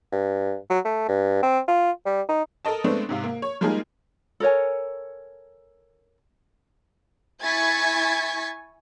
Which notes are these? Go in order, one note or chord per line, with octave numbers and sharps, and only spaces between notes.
G2
F#3
A3
G2
C4
F4
G3
D#4
A4 A#4 D#5 A5
G#3 A3 B3 C4 D4
G#2 C3 F5
A#3
C#5
G3 G#3 A#3 D#4 F4 G#4
A4 A#4 C#5 G#5
E4 G#5 C#6 G#6 A6 B6